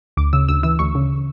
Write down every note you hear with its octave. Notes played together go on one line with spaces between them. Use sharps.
D2 D6
C#3 E6
D2 E6
E3 E6
D2 C#6
C#3